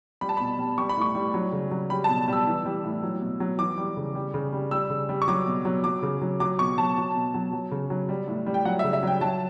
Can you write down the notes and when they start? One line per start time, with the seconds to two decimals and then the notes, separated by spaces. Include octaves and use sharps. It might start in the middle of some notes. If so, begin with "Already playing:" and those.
0.21 G3 B5
0.29 A5
0.37 B2 B5
0.59 G3
0.78 G3 C#6
0.89 B5
0.97 A2 C#6
1.15 G3
1.34 F#3
1.52 C#3
1.71 F#3
1.90 G3 B5
2.04 A5
2.09 B2
2.28 G3 E6
2.47 E3
2.65 G3
2.84 A2
3.03 F#3
3.21 B2
3.40 F#3
3.59 E3 D6
3.78 G3
3.97 C#3
4.15 G3
4.34 C#3
4.53 G3
4.71 G3 E6
4.90 C#3
5.09 G3
5.22 C#6
5.28 F#3 D6
5.46 B2
5.65 F#3
5.84 F#3 D6
6.03 C#3
6.21 F#3
6.40 F#3 D6
6.59 B2 C#6
6.78 F#3 A5
6.97 F#3
7.15 B2
7.34 F#3
7.53 F#3
7.72 C#3
7.90 F#3
8.09 G3
8.28 A2
8.47 G3
8.54 G5
8.65 F#3 F#5
8.79 E5
8.84 C#3
8.93 E5
9.03 F#3 G5
9.21 F#3 A5